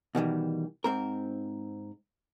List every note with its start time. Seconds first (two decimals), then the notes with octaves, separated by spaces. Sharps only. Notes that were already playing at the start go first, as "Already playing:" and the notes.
0.15 B2 D#3 E3 G3
0.84 G#2 C4 A#4